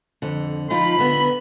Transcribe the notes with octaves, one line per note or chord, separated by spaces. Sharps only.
F2 D3
F3 D#4 F4 B5
D3 B3